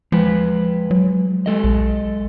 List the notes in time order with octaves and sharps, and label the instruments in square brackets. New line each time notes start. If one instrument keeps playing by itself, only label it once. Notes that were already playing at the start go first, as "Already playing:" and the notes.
[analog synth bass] F3 [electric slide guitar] G#3 B4
[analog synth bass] F#3
[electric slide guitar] G#3 A4 D#5
[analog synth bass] B1